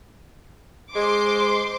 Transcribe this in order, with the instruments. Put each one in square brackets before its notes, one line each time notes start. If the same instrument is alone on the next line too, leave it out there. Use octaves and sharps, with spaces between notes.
[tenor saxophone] G#3 [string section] C5 C6 D6